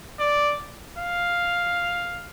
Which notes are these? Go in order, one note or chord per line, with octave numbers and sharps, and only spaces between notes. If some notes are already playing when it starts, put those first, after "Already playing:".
D5
F5